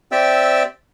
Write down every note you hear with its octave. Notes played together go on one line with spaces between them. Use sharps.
C4 G4 D5 E5 G5 E6